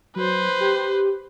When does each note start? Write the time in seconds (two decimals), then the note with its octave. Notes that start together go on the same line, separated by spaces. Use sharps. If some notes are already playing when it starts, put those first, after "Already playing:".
0.16 F#3 B4 C5
0.61 G4